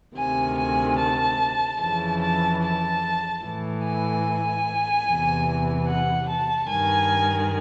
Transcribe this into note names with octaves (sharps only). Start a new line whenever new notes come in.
D2 C3 D#3 G#5
G#5
A5
F2 C#3 E3 A5
A5
A5
A2 E3
G#5
E2 C3 E3
F#5
A5
G2 D#3 G#5